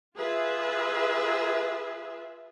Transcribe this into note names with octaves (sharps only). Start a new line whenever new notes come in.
F4 G#4 B4 E5